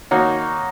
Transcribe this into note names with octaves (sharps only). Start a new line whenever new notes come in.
D#3 A#3 D#4 F#4 C#5